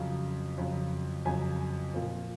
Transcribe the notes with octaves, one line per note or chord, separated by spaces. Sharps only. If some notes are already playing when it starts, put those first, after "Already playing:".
Already playing: F2 C#3 F#3
F2 C#3 F#3
F2 C#3 F#3 G#5
A#2 F3